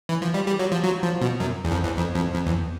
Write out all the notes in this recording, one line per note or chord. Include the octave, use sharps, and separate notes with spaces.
E3
F3
G3
G3
F#3
F3
F#3
F3
B2
F#2
E2
F2
E2
F2
F2
F2
E2